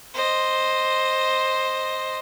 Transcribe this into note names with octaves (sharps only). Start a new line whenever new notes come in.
C5 D#5